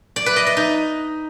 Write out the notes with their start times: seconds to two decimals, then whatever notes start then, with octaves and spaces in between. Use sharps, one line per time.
0.16 D5
0.26 B4
0.36 D#5
0.46 D#5
0.57 D#4